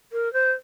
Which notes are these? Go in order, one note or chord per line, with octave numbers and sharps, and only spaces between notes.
A#4
C5